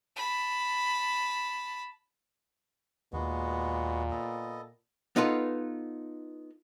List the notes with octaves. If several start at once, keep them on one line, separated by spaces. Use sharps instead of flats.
A5 B5
D#2 A#2 G#3 B3 F#4
B3 A4 D#5
B3 D#4 F4 A4 B4